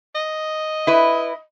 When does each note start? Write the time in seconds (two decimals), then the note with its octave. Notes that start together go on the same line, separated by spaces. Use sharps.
0.15 D#5
0.87 E4 B4